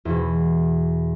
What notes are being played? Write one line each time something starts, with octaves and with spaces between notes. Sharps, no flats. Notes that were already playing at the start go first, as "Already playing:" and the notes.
E2 B2